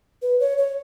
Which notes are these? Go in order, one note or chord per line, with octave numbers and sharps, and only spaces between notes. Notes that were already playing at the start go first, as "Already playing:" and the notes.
B4
C#5
C#5